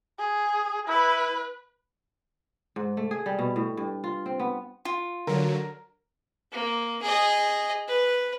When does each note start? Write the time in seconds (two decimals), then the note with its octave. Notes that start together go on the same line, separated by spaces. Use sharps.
0.19 G#4
0.88 E4 B4
2.76 G#2
2.97 A3
3.11 G#4
3.26 G3
3.39 B2
3.56 A2
3.77 G2
4.04 F4
4.26 C4
4.40 B3
4.85 F4
5.27 D3 F#3 A#4
6.52 A#3
7.02 G#4 D#5
7.88 B4